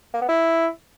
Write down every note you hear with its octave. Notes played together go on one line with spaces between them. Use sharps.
A#3
B3
E4